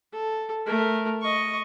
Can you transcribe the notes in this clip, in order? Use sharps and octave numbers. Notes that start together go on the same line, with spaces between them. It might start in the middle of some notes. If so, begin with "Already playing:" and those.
A4
A3 A#4
D#5 C#6